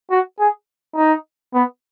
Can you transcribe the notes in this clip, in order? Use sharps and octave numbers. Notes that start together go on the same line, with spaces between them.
F#4
G#4
D#4
B3